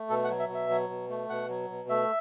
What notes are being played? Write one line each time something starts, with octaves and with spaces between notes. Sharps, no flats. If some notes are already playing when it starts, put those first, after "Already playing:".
Already playing: A3
B2 A4
F#5
F#3
E5
B2
E5
F#3
B2
A3
B2 F#5
F#3
B2
A3 E5